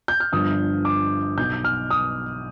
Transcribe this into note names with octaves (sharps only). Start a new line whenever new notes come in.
G6
F6
G1 G2 D3 F3 D#6
D6
B1 B2 G6
F6
D#6